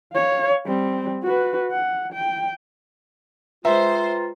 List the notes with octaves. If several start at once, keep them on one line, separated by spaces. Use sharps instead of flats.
C#5 F5
G3 C4
F#4 B4
F#5
G5
G#3 F4 B4 C5 E5 G5 A#5